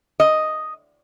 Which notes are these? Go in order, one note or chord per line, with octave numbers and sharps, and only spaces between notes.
D#5